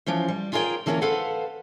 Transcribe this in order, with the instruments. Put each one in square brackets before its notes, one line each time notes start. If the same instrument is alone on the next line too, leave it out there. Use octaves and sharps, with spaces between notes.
[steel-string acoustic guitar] E3 F3 C#4 C5
G3
F4 G#4 A#4 C#5 D#5 G5
D3 E3 A#3 C#4 A#4 C#5
A4 B4 C5 F5 F#5